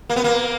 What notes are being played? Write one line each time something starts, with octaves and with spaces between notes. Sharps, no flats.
A#3
B3
A#3